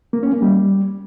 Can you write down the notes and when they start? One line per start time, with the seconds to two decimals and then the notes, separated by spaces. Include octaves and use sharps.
0.13 A#3
0.23 C#4
0.33 A#3
0.42 G3